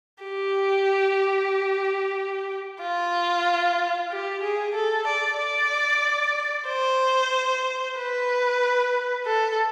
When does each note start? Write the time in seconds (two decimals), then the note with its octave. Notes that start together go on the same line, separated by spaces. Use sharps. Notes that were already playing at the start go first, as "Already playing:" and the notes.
0.24 G4
2.81 F4
4.11 G4
4.42 G#4
4.75 A4
5.07 D5
5.39 D5
6.68 C5
7.97 B4
9.26 A4